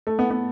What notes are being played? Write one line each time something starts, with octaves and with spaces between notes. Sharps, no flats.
A3
B3
B3